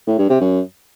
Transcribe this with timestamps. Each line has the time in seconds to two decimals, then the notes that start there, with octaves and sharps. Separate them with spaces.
0.07 A2
0.18 G2
0.29 C3
0.41 F#2